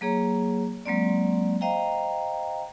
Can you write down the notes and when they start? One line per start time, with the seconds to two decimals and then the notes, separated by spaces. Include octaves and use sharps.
0.01 F#3 A#3 G#4 C#5 A#5
0.86 F#3 G#3 A#3 C4 D5
1.61 C5 D#5 F5 G5 A#5